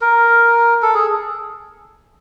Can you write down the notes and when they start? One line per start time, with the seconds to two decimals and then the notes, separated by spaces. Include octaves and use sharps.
0.01 A#4
0.82 A4
0.94 G#4